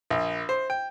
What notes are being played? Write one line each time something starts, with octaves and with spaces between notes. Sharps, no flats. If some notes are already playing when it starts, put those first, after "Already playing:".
A#1
C5
G5